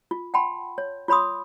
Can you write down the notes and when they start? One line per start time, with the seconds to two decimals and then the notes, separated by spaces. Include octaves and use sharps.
0.11 F4
0.34 F#5 G5 A5 B5 C6
0.78 C#5
1.08 F4 C#5 B5 C6 D#6